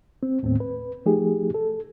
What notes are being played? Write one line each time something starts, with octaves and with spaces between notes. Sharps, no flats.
C4
D#2 A2 B3 C4
B4
F3 A3 D#4 G4 G#4
A4